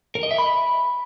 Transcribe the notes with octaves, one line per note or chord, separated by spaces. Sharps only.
A#4
D#5
E5
B5